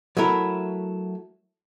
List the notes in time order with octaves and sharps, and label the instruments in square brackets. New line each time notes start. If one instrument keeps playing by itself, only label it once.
[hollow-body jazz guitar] F#3 A3 E4 A#4